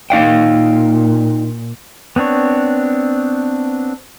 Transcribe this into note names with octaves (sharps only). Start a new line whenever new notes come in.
A#2 D#4 F5 G5
B3 C4 D4 C#5